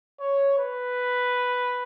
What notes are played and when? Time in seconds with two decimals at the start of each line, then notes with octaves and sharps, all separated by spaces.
0.20 C#5
0.58 B4